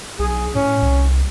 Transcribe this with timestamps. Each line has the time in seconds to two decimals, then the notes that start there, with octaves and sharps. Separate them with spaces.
0.19 B1 G#4
0.55 A2 C#4
0.82 C2